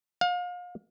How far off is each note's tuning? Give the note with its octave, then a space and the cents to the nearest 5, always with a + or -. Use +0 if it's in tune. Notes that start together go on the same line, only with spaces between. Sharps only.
F5 +35